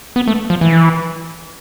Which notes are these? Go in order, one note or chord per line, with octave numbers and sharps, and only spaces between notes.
B3
A3
F3
E3